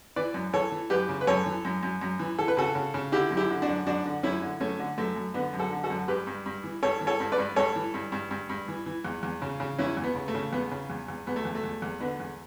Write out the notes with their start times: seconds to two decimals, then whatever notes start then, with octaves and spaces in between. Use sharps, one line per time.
0.16 E3 B4 D5
0.34 F#2
0.53 E3 A4 C#5
0.72 E3
0.90 F#2 G4 B4
1.09 C#3
1.21 B4
1.27 F#2 A4 C#5
1.46 E3
1.65 F#2
1.83 F#2
2.01 F#2
2.19 E3
2.38 E3 A4
2.48 B4
2.57 C#3 F#4 A4
2.75 C#3
2.94 C#3
3.12 D3 E4 G4
3.31 F#2
3.37 E4 G4
3.50 D3
3.62 D4 F#4
3.68 F#2
3.86 F#2 D4 F#4
4.05 D3
4.23 F#2 C#4 E4
4.42 D3
4.60 F#2 A3 C#4
4.79 D3
4.98 F#2 A3
5.16 F#2
5.34 D3 B3
5.53 F#2
5.59 F#4 A4
5.71 D3
5.84 F#4 A4
5.90 F#2
6.08 G2 G4 B4
6.27 G2
6.46 G2
6.64 E3
6.83 G2 A4 C#5
7.01 E3
7.07 A4 C#5
7.20 G2
7.32 B4 D5
7.38 G2
7.56 G2 A4 C#5
7.76 E3
7.94 G2
8.12 G2
8.31 G2
8.49 G2
8.68 E3
8.86 E3
9.05 E2
9.23 E2
9.42 C#3
9.60 C#3
9.78 E2 C#4 E4
9.97 E2
10.04 B3
10.15 C#3
10.28 A3
10.35 C#3
10.52 E2 B3
10.71 C#3
10.90 E2
11.08 E2
11.27 E2 B3
11.36 A3
11.45 E2
11.55 A3
11.64 E2
11.82 E2
12.00 D3 B3
12.20 E2